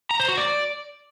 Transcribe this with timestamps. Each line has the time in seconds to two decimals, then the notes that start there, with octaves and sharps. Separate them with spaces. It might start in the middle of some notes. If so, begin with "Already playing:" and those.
0.11 A#5
0.20 C5
0.28 F#4
0.37 D5